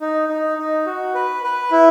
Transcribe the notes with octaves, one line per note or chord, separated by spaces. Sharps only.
D#4
D#4
D#4
F#4
B4
B4
E4